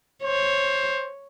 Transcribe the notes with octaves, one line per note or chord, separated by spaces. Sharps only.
C5 C#5